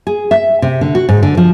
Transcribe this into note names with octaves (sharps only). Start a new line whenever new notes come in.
G#4
E5
C3
D3
F#4
G#2
D3
F3